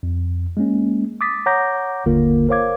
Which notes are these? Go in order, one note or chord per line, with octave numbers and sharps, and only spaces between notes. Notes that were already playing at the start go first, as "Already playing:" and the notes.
F2
G#3 A#3 C#4
D6 D#6 A6 B6
C#5 F#5 A#5 D6 G6 A#6
G1 D#2 D3 A#3 F4 A#4
A#4 C5 C#5 F5 D6 G#6